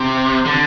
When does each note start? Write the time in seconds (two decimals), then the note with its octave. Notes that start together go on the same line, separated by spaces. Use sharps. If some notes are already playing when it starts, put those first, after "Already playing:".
Already playing: C3
0.46 D3